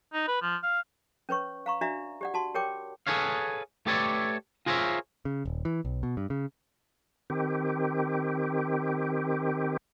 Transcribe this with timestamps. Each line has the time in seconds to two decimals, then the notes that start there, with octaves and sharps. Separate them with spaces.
0.13 D#4
0.28 B4
0.42 F3
0.63 F5
1.29 C#4 B4 C#5 C#6
1.66 F5 A#5 C#6
1.81 D4 F#4 D5 E5 A#5
2.21 G4 D5 F#5
2.34 F#4 A5 C6
2.54 G4 A#4 C#5 G5 D6
3.07 G#4 A4 B4 C#5 F5
3.86 A3 G4 A4 B4 C#5 D5
4.66 F4 G#4 A#4 C5 C#5 E5
5.25 C#3
5.45 D#1
5.65 E3
5.85 B1
6.03 B2
6.17 G2
6.30 C#3
7.30 D#3 C4 G4